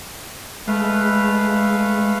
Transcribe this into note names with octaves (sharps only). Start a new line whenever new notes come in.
G#3 A3 B4 F5